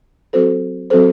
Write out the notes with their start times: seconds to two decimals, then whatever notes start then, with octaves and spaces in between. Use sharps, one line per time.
0.33 F#3 C4 F#4 A4 C5
0.90 F#3 C4 F#4 A4 C5